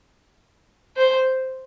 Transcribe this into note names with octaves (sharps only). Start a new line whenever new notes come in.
C5